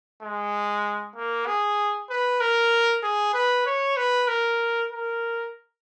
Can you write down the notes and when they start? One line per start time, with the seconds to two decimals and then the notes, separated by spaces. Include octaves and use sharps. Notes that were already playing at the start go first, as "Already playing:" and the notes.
0.22 G#3
1.16 A#3
1.47 G#4
2.10 B4
2.41 A#4
3.03 G#4
3.34 B4
3.66 C#5
3.97 B4
4.28 A#4
4.91 A#4